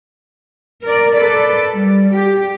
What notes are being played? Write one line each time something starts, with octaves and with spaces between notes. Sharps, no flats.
A#4 D5
A4 B4 D5
G3
G4